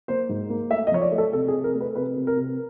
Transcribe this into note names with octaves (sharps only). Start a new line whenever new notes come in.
A#3 C5
G#2
A#3
A3 E5
D#5
F3 C#5
D5
A3
A4
C3 A4
G#4
C3
A#4
A3
B4
C3 B4
C3
A#4
C3